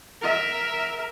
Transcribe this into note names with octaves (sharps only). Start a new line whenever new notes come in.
A#4 E5